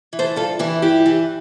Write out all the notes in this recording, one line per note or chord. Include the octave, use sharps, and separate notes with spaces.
E3
A4 C5
G2 F4 A4
E3 E4 G4
G2 E4 G4
E3